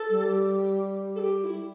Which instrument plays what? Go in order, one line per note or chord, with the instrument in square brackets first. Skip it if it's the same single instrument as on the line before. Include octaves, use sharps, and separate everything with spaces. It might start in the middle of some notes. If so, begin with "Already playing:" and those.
Already playing: [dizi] A4
[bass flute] G3
[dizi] G4
A4
G4
E4